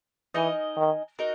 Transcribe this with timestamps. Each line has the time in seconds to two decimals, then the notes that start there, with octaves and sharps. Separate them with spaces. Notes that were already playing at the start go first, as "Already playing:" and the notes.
0.34 E3 D#4 A#4 D#5 G#5
0.77 D#3
1.19 D#4 F#4 A#4